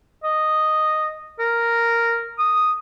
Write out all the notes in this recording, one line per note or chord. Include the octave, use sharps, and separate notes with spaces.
D#5
A#4
D#6